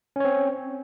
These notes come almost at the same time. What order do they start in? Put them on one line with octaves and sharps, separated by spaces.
C#4 C#5 C4